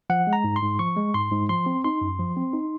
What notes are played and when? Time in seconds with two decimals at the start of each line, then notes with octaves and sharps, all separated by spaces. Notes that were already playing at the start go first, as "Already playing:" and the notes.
0.10 F3 F#5
0.27 G#3
0.33 A#5
0.44 G#2
0.56 C6
0.62 G#2
0.79 F3 C#6
0.97 G#3
1.14 G#2 C6
1.32 G#2
1.49 F3 C6
1.66 C4
1.84 D#4 C6
2.01 F#2
2.19 F3
2.36 C4
2.53 D#4